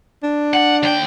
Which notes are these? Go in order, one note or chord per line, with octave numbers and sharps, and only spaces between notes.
D4
F#5
D#2 G5